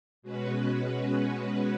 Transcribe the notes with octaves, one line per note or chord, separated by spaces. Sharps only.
B2 G#3 C#4 F#4 B4